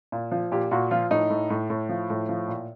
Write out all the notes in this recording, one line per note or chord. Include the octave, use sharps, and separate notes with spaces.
A#2
F3
A#2 G4
A#2 F#4
F3 F4
A2 D#4
A2
A2
A2
F3
A2
F3
A#2